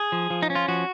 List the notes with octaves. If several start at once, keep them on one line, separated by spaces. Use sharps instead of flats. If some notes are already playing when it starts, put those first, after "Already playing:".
Already playing: G#4
F3
F3
D#4
C#4
F4
F3 F#4